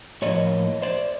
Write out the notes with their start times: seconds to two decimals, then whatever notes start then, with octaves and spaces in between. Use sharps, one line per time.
0.22 A2 F3 A#3 C#5 D#5
0.82 C5 D5